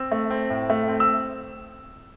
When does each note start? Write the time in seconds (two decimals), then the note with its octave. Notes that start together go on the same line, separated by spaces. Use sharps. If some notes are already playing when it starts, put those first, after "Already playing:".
Already playing: C4 E6
0.11 A3
0.30 C4
0.50 A2
0.70 A3
0.88 C4
1.00 E6